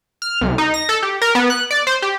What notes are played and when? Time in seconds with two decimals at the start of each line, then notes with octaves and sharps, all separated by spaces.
0.22 F6
0.41 C2
0.58 D#4
0.74 A#6
0.89 A4
1.02 G4
1.22 A#4
1.35 B3
1.50 F#6
1.71 D5
1.87 C5
2.02 G4